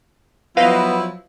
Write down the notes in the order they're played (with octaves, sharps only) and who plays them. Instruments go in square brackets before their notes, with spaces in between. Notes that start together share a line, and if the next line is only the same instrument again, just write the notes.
[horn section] F3 F#3 E4 [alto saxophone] B3 [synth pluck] B4 D#5 F5